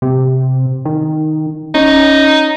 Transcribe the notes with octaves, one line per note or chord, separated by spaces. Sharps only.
C3
D#3
C#4 D#4